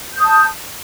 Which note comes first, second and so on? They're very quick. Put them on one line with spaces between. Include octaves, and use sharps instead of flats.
G6 D#6 A5